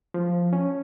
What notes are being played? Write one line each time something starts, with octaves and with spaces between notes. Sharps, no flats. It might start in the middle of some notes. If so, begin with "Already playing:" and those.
F3
C#4